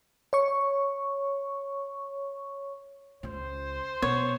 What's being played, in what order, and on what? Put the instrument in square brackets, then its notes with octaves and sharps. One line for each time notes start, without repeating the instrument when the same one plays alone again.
[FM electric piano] C#5 C#6
[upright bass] C#2 C#3 [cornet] C5
[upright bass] B2 [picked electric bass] B3 [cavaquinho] C#5